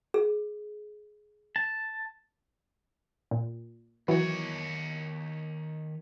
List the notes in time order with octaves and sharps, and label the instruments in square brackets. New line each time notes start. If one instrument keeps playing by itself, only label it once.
[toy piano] G#4
[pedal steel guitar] A5
[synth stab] A#2
[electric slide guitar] D#3 C#5 [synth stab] E3 F#3